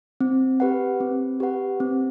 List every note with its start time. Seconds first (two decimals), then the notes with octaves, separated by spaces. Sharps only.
0.20 C4
0.60 G4 B4 F#5
1.00 C4
1.40 G4 B4 F#5
1.80 C4